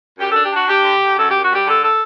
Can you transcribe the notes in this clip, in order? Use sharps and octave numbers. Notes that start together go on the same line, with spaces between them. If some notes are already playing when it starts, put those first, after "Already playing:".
F#2 G4
D4 A4
G4
D4 F#4
D4 G4
D3
D3
F#2 A4
G4
F#2
F#4
G3 G4
D3 A4
A4